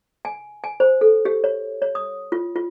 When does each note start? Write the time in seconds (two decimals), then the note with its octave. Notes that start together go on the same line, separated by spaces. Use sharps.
0.25 G#5
0.64 G#5
0.80 C5
1.01 A4
1.25 G4
1.44 C#5
1.82 C#5
1.95 D#6
2.32 F4
2.56 F4